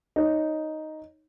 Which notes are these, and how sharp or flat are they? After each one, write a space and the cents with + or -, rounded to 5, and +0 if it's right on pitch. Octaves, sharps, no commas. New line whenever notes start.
D#4 +0 C#5 +0